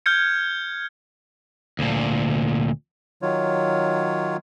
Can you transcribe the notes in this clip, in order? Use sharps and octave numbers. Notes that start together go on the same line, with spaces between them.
F6 G6 G#6 C#7
D2 A#2
D#3 F#3 F4 C#5